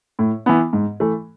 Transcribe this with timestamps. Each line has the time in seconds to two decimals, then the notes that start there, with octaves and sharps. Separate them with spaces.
0.19 A2
0.46 E3 B3
0.73 G#2
1.00 E3 A3